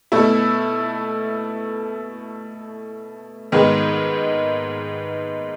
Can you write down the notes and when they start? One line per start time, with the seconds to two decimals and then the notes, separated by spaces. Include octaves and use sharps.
0.12 B2 A3 E4
3.52 G#2 D#3 G#3 B3